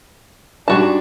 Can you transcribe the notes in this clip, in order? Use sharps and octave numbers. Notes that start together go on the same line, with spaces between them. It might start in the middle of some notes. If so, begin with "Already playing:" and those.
G#2 G3 G#3 D4 F#4 A5